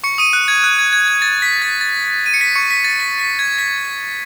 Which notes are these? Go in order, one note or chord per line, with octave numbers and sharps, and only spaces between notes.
C#6 C#7
D#6 D#7
F#6
G#6
F#6
G#6
G#6
G#6
A6
B6
A6
A6
D#7
C#7
B6
C#6 C#7
B6
A6
B6
B6
G#6
B6